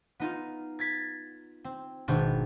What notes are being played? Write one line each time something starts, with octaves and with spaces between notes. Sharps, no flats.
B3 D#4 F4
G#6 A6 B6
C4
G#1 B2 D4 C5 C#6 G6